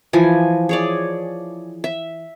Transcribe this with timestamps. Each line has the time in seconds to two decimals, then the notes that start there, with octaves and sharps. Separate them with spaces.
0.13 E3 F3 G#5
0.69 G#4 C#5 D5
1.84 E5